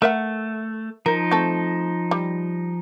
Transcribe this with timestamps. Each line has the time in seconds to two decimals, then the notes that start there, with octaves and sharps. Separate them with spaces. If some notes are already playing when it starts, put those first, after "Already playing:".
0.02 A3 A#4 E5 F#5
1.06 F3 D#4 A#4
1.31 A3 C4 A4
2.11 G3